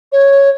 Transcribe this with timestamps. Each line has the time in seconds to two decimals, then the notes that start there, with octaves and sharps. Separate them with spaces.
0.12 C#5